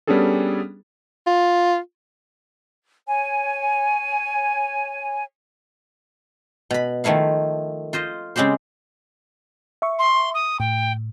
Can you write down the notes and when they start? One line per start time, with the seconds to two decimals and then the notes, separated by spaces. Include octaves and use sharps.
0.07 G3 B3 C#4 D4 G#4 A4
1.27 F4
3.07 C#5 G#5
6.71 B2 B5
7.04 D#3 F3 A3 E4 F5
7.93 F4 C5 D#5
8.36 C#3 G#3 C4 G4 C5
9.82 E5 C#6
9.99 C6
10.34 D#6
10.60 A2 G5